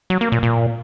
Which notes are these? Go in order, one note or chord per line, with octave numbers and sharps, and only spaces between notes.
F#3
A#3
A#2
A#2